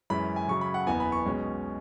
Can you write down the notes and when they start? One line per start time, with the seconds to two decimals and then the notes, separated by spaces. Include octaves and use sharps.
0.10 F#2 E3 G#3 C#4 B5
0.36 G#5
0.48 F#2 C#3 F#3 C#4 C#6
0.61 B5
0.74 F#5
0.87 F#1 E2 E3 B3 G#5
1.00 B5
1.12 C#6
1.25 B1 B2 G#3 C#4